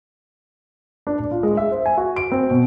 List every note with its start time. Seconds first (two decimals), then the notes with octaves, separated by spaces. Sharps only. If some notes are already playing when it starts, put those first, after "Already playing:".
1.07 D4
1.19 D1
1.31 F4
1.43 G#3
1.57 E5
1.72 C5
1.86 G#5
1.98 F#4
2.16 D7
2.32 C4
2.50 B2